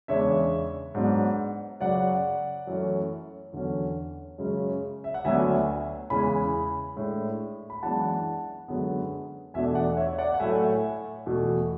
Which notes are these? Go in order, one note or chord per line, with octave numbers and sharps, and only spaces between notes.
E2 C#3 G#3 D4 C#5 E5
G#2 F#3 B3 D4
F#2 C#3 F#3 D5 F#5
F#2 E3 A3 C#4
E2 D3 F#3 C#4
F#2 C#3 G#3 C#4
E5
F#5
D2 D3 F#3 B3 D4 E5 G#5
E2 C#3 E3 G#3 G#5 B5
A2 G#3 D4
B5
F#2 E3 G#3 B3 D4 F#5 A5
F#2 D3 G#3 B3
E2 B2 A3 D4 E5 G#5
D5 F#5
C#5 E5
D5 F#5
F#5
A2 F#3 A3 E5 G#5
E2 B2 A3